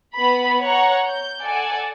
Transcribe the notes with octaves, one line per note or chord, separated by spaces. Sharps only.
B3 B5
C#5 F#5 A#5
G6
A4 D5 F#5 G#5